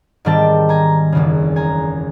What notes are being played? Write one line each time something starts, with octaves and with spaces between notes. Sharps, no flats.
G#2 D#3 G3 C4 G5 A5
G#5 A#5
F#1 E2 C#3
G#5 A#5